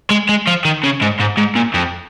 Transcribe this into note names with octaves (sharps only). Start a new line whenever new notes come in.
G#3
G#3
F3
D#3
C#3
G#2
G#2
G#2
A#2
F2